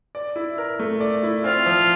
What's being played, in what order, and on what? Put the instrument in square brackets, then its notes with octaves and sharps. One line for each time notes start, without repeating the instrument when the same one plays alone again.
[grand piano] D5
E4
A#4
A3
D5
E4
[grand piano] C4 [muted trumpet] F4
[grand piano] F3